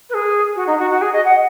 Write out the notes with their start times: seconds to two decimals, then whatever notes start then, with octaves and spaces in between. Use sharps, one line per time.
0.09 B4
0.14 G#4
0.56 F#4
0.67 D#4
0.78 F#4
0.90 F#4
1.01 G#4
1.13 D#5
1.25 F#5